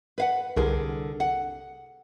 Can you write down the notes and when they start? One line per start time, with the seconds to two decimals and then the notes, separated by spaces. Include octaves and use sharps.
0.18 B4 F5 F#5
0.56 C2 D3 G#4 A#4
1.20 F#5